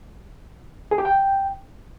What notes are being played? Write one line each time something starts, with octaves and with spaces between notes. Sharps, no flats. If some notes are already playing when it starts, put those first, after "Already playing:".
G#4
G4
G5